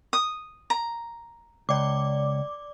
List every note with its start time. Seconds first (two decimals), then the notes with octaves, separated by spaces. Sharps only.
0.13 D#6
0.70 A#5
1.69 C#2 D5 D6